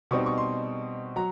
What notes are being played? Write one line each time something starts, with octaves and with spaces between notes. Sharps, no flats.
B2 G3 C4 D#4 C#6
C#6
C6
F#3 A#5